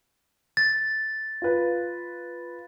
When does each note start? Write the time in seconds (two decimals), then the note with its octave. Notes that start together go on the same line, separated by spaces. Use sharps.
0.57 A6
1.42 F4 B4